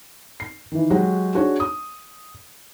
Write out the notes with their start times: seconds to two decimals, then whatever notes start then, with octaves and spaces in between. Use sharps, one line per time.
0.40 C7
0.72 D#3 E3
0.90 F#3 G#3 F#4 G4
1.35 D4 F#4 G#4 C#5
1.60 D#6